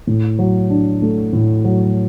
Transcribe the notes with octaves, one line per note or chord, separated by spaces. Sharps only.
A2
F#3
D4
A3
A2
F#3